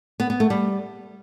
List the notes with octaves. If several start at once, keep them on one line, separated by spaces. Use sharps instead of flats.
B3
B3
A3
G3